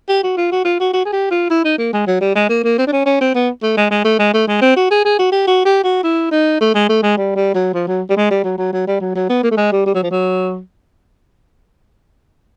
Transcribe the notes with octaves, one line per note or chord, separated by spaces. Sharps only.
G4
F#4
F4
F#4
F4
F#4
F#4
G#4
G4
F4
E4
D#4
A#3
G#3
F#3
G3
G#3
A#3
A#3
C4
D4
C#4
C#4
C4
B3
A3
G#3
G#3
A3
G#3
A3
G#3
C4
F#4
G#4
G#4
F#4
G4
F#4
G4
F#4
E4
D#4
A3
G#3
A3
G#3
G3
G3
F#3
F3
F#3
G3
G#3
G3
F#3
F#3
F#3
G3
F#3
F#3
B3
A#3
A3
G#3
G3
G3
F#3
F3
F#3